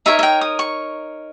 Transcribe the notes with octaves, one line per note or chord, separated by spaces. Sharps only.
D#4 A#4 C#5 E5
E5
G5
D#6
C#6